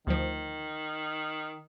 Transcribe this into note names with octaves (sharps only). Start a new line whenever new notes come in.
D2 D#3 F3